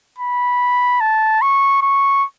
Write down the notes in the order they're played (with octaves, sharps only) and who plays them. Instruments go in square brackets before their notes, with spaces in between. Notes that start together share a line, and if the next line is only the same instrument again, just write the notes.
[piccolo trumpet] B5
A5
C#6
C#6